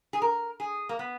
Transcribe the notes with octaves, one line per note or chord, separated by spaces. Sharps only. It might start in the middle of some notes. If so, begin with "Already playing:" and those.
G#4
A#4
G#4
A#3
B3